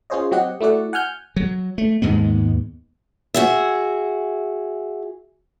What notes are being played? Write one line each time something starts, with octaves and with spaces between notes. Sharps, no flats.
C#4 F4 G#4 C5 C#5 D#5
F#3 C4 G4 D#5 F#5
A3 E4 F#4 D5 F#5
F#5 G#5 F6 G6
F#3
A3
D#2 G#2 G#3 B3
F#4 G#4 E5